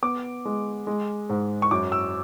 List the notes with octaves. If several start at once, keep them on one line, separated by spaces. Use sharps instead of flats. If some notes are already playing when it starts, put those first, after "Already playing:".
B3 D6
G#3
G#3
G#2
C#6
F#2 D6
E6